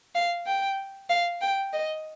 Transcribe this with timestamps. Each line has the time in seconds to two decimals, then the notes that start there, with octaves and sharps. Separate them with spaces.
0.15 F5
0.46 G5
1.10 F5
1.41 G5
1.73 D#5